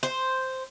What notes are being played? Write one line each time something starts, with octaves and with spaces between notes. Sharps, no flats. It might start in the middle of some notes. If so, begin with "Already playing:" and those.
C5